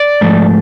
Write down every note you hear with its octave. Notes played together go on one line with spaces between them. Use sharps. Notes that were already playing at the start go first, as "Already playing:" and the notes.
Already playing: D5
G#2 F3 A3